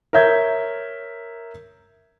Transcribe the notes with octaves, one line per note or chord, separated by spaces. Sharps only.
A#4 C#5 E5 G6 G#6